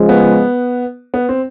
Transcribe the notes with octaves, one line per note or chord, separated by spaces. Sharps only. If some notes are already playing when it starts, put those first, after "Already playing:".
Already playing: C#3 F3 G#3
B3
B3
C4